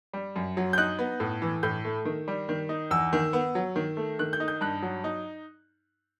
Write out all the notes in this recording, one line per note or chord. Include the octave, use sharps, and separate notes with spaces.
G3
F#2
F#3
G6
D#4 F#6
B3
A2
E3
A2 G6
A3
D#3
G3
D#3
D#4
E2 E6
D#3
B3
F#3
D#3
A3
D#3 F#6
G6
D#4
G6
G2 F#6
F#3
D#4